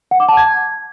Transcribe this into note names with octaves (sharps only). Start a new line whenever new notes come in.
F#5
D6
A5
G#6